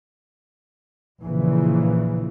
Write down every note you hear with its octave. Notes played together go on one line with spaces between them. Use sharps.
A#1 A#2 C#3 E3